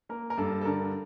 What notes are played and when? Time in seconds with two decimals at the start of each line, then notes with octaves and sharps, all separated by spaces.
0.09 A#3 A#4
0.30 A#4
0.38 G2 A4
0.61 A4
0.65 D3 A#4